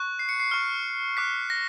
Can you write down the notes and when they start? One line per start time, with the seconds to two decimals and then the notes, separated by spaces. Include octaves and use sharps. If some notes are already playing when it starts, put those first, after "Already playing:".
Already playing: C#6 F#6
0.19 C7
0.29 C#7
0.40 C7
0.51 C#6 F6
1.17 D6 F#6 B6
1.50 A#6